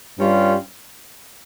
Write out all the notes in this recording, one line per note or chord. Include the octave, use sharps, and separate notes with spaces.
G2 G3 C#4 F4